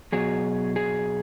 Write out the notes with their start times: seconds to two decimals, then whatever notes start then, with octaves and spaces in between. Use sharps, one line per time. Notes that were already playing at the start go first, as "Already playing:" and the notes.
0.12 B2 F#3 G#4
0.76 G#4